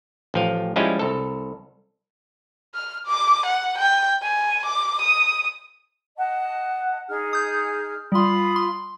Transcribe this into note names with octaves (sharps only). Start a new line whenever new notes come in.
A1 F3 F5
F3 G3 G#3 C#4 E4 F4
C2 A4
F6
D6
F#5
G5
G#5
D6
D#6
D#5 F#5 A5
D#4 G#4 F6
D#6 G6
G3 F4 B5 C6 D#6
C6